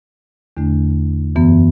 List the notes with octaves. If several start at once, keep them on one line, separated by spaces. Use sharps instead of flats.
E2 D3 A3 D4
F#2 E3 B3